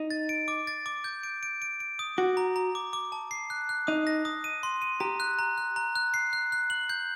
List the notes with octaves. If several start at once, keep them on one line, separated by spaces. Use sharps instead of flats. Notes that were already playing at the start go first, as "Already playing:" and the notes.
Already playing: D#4
A6
D7
D6
A6
D6
G6
D7
D7
D7
D7
D#6
F#4 D6
A#5
A#5
D6
D6
A5
C7
F#6
F#6
D#4 D#6
A#6
D#6
D#7
C6
D#7
G4 A#5
F#6
A#5
F#6
A#5
F#6
C7
F#6
F#6
F#7
G6